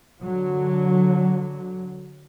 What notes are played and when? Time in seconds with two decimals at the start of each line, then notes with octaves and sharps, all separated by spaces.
0.23 D3 F#3